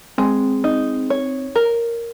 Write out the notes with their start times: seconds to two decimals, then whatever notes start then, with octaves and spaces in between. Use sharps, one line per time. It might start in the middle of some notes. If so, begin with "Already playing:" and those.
0.18 G#3 C4
0.64 D#4
1.10 C#5
1.56 A#4